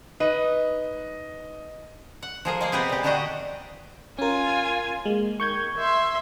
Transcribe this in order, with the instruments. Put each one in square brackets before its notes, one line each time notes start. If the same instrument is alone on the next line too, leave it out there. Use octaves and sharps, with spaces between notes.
[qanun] D#4 B4 [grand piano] D#5
[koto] F#5
F3 G#4 A#4
G#3 A#3 G#4
C3 B3 G4 G#4
A#2 G4
D3 D#3 D4 F#4 G4 D#5
[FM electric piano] C#4 A#4 [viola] F4 G#5
[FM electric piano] G#3 [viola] A#3
[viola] D#3 [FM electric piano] C#6 G6 G#6
[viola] E5 C6